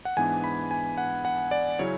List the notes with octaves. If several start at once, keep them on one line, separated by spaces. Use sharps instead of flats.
F#5
G#2 E3 B3 D4 G#5
B5
G#5
F#5
F#5
D5
C#3 F#3 C#4 E4 C#5